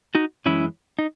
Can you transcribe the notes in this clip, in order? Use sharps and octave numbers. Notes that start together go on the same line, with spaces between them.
D#4 F#4
F#2 E3 G#3 C#4 E4
D#4